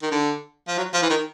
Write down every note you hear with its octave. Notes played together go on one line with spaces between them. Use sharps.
D#3
D3
F3
F#3
F3
E3
D#3